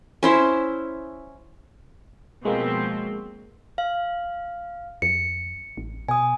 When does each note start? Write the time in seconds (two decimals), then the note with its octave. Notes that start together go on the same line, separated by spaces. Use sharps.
0.23 C#4 E4 C5
2.45 B2 F3 G#3 A#3 C4
3.78 F5
5.02 F2 C#7
5.77 A1
6.09 B2 G#5 D#6